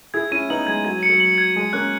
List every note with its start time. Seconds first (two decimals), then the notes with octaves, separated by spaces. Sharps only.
0.14 E4 G#4 G#6
0.31 C#4 E4 D#7
0.50 B3 D#4 F#7
0.67 G#3 G#6
0.85 F#3 G#6
1.03 C#7
1.09 F#3
1.20 F#7
1.38 G#6
1.55 G#3 D#7
1.73 A#3 C#4 F#6